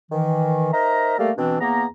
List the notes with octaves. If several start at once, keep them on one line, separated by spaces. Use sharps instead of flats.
D#3 E3
D#4 A#4 C5 E5 A#5
G3 A3 A#3 A4 A#4 F5
B2 E3 C4 D4
E2 A#3 B3 A#5